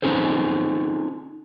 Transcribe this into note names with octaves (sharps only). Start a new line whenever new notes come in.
C4 C#4 D#4 G#4 A4 C5